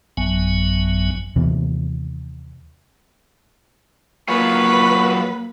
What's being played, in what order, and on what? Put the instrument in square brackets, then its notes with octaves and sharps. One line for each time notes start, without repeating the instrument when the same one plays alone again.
[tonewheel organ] A1 F#2 F#3 B3 G#5
[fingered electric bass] D#2 C3 E3 B3
[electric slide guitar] F#3 F4 G#4 [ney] A#3 [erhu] B4 [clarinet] C#6